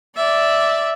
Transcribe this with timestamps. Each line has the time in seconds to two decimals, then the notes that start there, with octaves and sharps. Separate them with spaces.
0.16 D5 E5